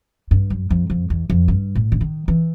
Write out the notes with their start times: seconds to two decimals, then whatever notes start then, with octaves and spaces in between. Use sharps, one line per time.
0.31 G2
0.50 F#2
0.70 F2
0.90 F2
1.10 E2
1.30 F2
1.48 G2
1.75 A2
1.92 D3
2.01 D#3
2.28 E3